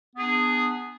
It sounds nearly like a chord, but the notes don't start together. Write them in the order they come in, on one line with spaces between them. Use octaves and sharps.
B3 G#4 D4